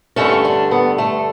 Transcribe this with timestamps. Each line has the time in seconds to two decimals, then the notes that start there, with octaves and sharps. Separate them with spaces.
0.16 G2 D3 A3 C#4
0.45 D4
0.71 B3
0.98 A3